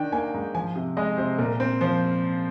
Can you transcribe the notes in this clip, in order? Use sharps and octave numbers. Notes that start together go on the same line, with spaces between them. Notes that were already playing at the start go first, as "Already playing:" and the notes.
Already playing: D#3 D4 G5
A#3 G#5
G#2
F3 G#5
C3
G#3 D#5
C3 C5
A#2 A#4
C4
F3 C5